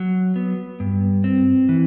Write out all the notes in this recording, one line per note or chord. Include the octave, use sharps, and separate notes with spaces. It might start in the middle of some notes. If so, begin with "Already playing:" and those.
Already playing: F#3
B3
G2
C4
E3